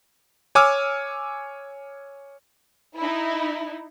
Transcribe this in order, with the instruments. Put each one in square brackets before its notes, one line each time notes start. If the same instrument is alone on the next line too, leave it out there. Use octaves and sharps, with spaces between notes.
[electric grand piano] C#5 G#5 D6 E6 F6
[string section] D#4 E4